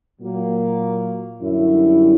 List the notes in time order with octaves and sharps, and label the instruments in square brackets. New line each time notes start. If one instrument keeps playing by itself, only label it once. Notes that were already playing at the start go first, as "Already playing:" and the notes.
[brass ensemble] A#2 F#3 A#3
F#2 D3 G3 C#4 E4